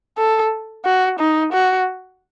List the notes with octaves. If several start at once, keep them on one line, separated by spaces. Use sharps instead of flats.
A4
F#4
D#4
F#4